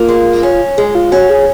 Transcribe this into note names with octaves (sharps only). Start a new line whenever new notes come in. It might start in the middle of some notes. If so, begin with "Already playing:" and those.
Already playing: A#3 F4
G#3
C#4
G#3 G#4
F4
C#4 F#4
G#4